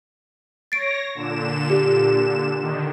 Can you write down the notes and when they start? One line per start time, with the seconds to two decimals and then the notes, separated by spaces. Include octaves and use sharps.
0.72 C#5 A6 A#6 C7 D7
1.15 A#2 D3 E7
1.70 G4
2.56 D3 D#3